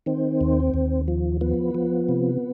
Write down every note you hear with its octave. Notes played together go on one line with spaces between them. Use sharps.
D#3 C4
D#2
D#2
F3
F3 B3
F3
C3